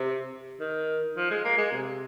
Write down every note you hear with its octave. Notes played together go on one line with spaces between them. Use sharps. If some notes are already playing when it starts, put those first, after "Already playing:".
Already playing: C3
D#3
F3
G#3
A#3
G#3
C3